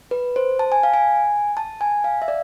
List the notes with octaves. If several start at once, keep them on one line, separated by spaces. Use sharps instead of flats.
B4
C5
A5
G#5
F5
G#5
A5
G#5
F5
E5
D5